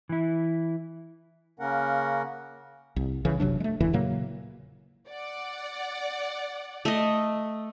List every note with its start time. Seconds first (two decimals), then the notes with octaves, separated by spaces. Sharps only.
0.09 E3 E4
1.59 C#3 A#3 C#4 A#4 F#5
2.96 C2
3.25 C2 C#3 E3
3.40 F#1 C3 F#3 D4
3.60 G#3 A3
3.80 F#1 E2 D3 E3
3.93 A#2 C#3 F#3 A#3
5.10 D5 F#5
6.85 A3 D#5